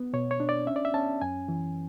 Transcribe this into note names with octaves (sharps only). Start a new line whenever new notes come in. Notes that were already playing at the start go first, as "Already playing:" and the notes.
Already playing: B3
B2 C#5
C#5
D4
D5
C#4 E5
D5
E5
C#4 A5
F#2 G#5
E3